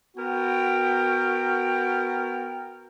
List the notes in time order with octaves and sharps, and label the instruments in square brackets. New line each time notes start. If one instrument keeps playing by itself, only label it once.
[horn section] B3 F#4 A#4 G5